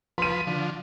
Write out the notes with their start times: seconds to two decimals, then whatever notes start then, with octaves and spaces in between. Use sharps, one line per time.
0.18 F3 B4 C6 D#7
0.47 D3 F3